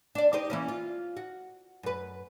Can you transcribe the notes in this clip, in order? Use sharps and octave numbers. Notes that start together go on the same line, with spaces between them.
D4 D5
D#4 G4 C5
E3 A#3 C#4
F4
F#4
F#2 B4